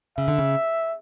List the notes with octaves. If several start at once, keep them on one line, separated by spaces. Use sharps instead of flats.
C#3 E5
D3
C#3